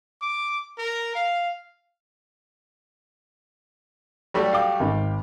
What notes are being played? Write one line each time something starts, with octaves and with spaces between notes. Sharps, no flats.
D6
A#4
F5
F#3 G3 A3 G4 D5 G5
F5 G5 D6
G#1